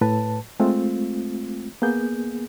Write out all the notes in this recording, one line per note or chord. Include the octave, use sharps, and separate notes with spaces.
A2 B4 A5
G#3 A3 C4 F4
A#3 B3 G#4 G6